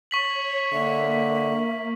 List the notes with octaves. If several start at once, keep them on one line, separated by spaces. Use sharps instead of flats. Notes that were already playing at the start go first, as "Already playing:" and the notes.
C#5 C#6 B6 F#7
D3 A#3 E5